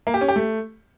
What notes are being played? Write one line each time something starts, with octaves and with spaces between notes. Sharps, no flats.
A#3
G4
C#4
G4
A3